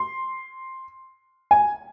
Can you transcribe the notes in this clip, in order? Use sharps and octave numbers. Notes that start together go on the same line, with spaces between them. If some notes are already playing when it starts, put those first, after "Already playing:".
Already playing: C6
G#5